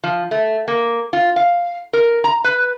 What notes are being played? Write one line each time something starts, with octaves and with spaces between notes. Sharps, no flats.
F3
A3
A#3
F4
F5
A#4
A#5
B4